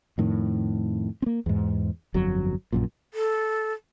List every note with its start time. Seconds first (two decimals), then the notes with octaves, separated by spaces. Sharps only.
0.18 F2 A2 D#3
1.22 A#3 C4
1.46 E2 G#2
2.14 G1 F2 F#3
2.73 A#1 F#2 A#2
3.14 A4